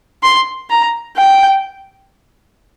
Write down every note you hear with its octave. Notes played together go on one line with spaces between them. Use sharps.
C6
A#5
G5